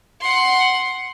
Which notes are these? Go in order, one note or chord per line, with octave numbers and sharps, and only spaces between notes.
F#5 C6